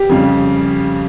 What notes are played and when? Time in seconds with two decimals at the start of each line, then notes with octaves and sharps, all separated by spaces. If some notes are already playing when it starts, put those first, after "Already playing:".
Already playing: G4
0.09 F2 C#3 G3